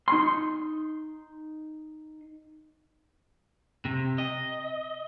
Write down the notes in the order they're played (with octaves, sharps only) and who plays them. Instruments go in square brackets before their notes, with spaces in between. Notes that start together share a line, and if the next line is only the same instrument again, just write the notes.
[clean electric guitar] D#4 C6
[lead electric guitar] C3
D#5